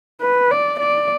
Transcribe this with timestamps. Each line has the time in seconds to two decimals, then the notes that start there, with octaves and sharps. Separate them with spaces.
0.21 B4
0.51 D5
0.80 D5